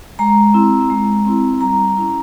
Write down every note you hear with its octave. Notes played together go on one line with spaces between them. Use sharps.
G#3 A#5
C4 E4
G#3
C4 E4
G3 A#5
C#4 E4